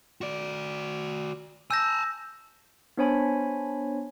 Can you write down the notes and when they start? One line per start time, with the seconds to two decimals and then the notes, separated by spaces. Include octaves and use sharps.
0.21 F#4 D5
1.71 G#5 A5 E6 G6 A#6
2.97 B3 D4 C5 C#5 G#5 B5